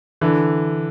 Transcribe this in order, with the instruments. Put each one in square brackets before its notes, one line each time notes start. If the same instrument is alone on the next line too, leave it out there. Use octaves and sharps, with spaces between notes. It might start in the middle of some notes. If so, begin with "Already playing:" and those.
[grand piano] D3 E3